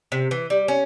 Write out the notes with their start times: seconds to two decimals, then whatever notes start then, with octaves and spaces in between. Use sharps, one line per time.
0.12 C3
0.31 E3
0.50 G3
0.68 C#4